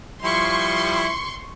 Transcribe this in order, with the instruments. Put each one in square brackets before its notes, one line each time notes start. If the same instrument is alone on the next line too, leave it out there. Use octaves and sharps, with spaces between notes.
[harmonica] F3 G3 E4 [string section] C6 C#6